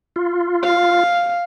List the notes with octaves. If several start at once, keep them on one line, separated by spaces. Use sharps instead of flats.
F4
F5